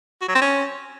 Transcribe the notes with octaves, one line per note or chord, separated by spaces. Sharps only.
F#4
F#3
C4
C#4